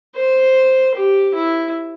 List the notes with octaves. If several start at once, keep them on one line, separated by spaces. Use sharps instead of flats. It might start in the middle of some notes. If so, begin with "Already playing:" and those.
C5
G4
E4